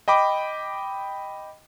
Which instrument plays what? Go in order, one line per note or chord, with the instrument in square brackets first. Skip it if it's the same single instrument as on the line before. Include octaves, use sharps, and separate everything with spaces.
[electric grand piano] D#5 G5 B5 D6